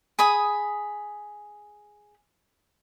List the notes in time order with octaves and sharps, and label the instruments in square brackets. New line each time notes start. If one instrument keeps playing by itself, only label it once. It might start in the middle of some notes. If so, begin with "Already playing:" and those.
[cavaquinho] G#4 B5 D#6